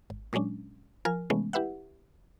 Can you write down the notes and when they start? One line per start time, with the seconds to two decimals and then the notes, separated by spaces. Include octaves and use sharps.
0.10 G#1
0.33 A#2 F#3 G#3 C#4 D4
1.05 F3 A#4 G#5 F6
1.30 C3 E3 G#3 A3 B3 C#4
1.53 E4 G4 B4 E5 F#5